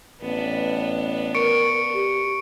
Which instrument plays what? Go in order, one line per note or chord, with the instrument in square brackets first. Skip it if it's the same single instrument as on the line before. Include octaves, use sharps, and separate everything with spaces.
[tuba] A1 [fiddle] B3 D4
[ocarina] A#4 [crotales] C#6 C#7 D7
[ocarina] G4